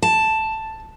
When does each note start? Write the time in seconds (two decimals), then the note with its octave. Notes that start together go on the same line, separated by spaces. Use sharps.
0.02 A5